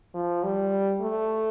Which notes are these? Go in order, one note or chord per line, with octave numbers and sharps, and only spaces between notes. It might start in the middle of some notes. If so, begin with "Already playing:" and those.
F3
G3
A3